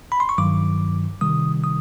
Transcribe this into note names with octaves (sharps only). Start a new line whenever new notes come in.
B5
C6
C#6
G2 D#3 F#3 D6
C3 D#3 G3 D#6
D#6